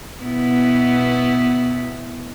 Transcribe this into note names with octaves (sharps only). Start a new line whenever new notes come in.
B2 B3 E4